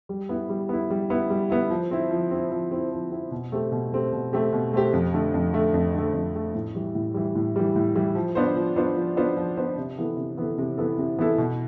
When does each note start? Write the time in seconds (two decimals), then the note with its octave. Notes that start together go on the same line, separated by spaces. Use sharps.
0.09 G3
0.29 B3 E4
0.50 G3
0.69 B3 E4
0.90 G3
1.10 B3 E4
1.30 G3
1.50 B3 E4
1.70 F3
1.91 C4 E4
2.11 F3
2.31 C4 E4
2.52 F3
2.71 C4 E4
2.92 F3
3.11 C4 E4
3.31 B2
3.52 A3 C4 G4
3.72 B2
3.92 A3 C4 G4
4.12 B2
4.33 A3 C4 G4
4.53 B2
4.73 A3 C4 G4
4.93 F2
5.13 D3 A3
5.34 F2
5.53 D3 A3
5.74 F2
5.94 D3 A3
6.13 F2
6.34 D3 A3
6.55 A2
6.75 E3 G3
6.95 A2
7.14 E3 G3
7.35 A2
7.56 E3 G3
7.76 A2
7.96 E3 G3
8.15 F3
8.35 B3 D4 F4 C5
8.56 F3
8.76 B3 D4 F4 C5
8.97 F3
9.17 B3 D4 F4 C5
9.37 F3
9.57 B3 D4 F4 C5
9.78 C3
9.98 E3 B3 E4 A4
10.17 C3
10.37 E3 B3 E4 A4
10.58 C3
10.77 E3 B3 E4 A4
10.98 C3
11.19 E3 B3 E4 A4
11.38 B2